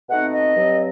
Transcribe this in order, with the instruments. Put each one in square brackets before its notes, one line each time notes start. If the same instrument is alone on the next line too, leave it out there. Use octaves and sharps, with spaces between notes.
[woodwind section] B2 A3 C4 D#4 F#5
D#5
G2 F#3 C4